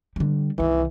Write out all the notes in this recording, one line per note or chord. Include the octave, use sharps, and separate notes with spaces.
D3 G3
C2 D#3 E3